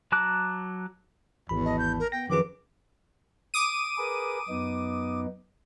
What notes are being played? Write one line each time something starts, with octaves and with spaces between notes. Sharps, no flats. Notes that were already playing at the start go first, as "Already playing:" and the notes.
F#3 A5 A#5 D6 F#6
G#1 E2 B5
D#5 A5
G6
A#4
B3 G5 A#6
F#2 D#3 F3 G#4 B4 D6
D6 D#6 D#7
G#4 A#4 B4
F#2 B3 D#4